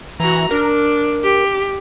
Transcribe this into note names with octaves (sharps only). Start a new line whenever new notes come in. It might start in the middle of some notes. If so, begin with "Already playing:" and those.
E3 F#4 A#5
D4 A#4
G4